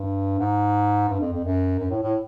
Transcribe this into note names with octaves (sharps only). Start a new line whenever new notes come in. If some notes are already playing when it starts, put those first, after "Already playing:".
Already playing: G2
G#2
G2
F2
F2
F#2
F#2
A2
A2